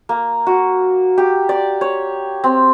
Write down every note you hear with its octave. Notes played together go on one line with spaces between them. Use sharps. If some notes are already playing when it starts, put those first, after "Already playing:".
A#3
F#4
G4
D5
C#5
C4